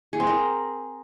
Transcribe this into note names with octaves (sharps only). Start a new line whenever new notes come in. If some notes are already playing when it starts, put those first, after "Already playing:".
G#4
C4
A#4